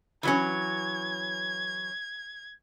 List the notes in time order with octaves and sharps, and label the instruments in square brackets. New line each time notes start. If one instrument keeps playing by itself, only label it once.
[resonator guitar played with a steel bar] E3 F#3 C#4 [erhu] G#6